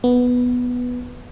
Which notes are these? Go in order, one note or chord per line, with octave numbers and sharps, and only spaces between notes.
B3